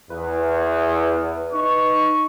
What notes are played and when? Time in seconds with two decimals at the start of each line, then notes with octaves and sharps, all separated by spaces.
0.10 E2 B4
1.53 D#4 C#6